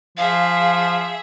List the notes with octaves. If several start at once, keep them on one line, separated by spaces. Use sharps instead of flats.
F3 G#4 E5 F5